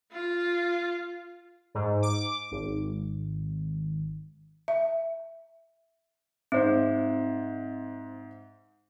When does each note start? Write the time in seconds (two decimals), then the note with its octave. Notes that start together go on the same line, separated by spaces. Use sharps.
0.12 F4
1.75 G#2
2.02 D6
2.51 G#1
4.68 E5
6.52 G#2 C4 C5 E5